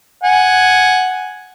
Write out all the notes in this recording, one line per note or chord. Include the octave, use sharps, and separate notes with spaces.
F#5 G#5